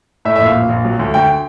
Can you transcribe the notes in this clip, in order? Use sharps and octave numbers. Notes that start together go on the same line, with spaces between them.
A2 E5
E5
A#1 F5
A#1
A#1
F#3
D2
D2 G5